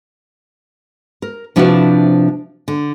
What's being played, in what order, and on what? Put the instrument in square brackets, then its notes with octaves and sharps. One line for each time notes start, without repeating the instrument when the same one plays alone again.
[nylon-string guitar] A#4
C3 F3 D4 E4 F#4 B4
D3